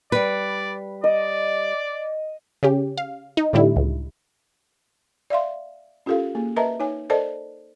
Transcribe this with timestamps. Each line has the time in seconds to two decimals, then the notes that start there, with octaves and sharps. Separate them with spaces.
0.12 G3 B4 D5
1.04 D5 D#5
2.63 C#3 C#4 G4
2.98 F5
3.37 D#4
3.53 A2 D3 G3 E4
3.76 C#2
5.30 D5 E5 F5 C6
6.06 C#4 F4 G4 A4 A#4 F5
6.35 A#3 G#4
6.56 A#4 B4 D#5 E5 A5 A#5
6.80 D#4 C#5 G#5
7.10 A4 A#4 C5 D5 D#5 A5